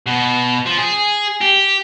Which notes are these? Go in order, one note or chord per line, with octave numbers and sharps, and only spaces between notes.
B2
F3
G#4
G4